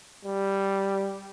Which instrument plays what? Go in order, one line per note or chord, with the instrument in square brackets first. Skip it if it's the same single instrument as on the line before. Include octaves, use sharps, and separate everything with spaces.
[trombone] G3